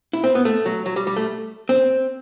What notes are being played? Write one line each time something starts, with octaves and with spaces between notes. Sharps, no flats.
E4
C4
B3
A3
F#3
F#3
G3
G3
A3
C4